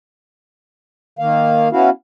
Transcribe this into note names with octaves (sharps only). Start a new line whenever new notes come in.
D#3 A#3 F5
B3 C#4 E4 F#4 F5